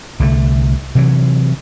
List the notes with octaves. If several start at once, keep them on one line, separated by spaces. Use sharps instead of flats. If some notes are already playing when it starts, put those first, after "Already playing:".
C2 D3 A3
C3 E3 F#3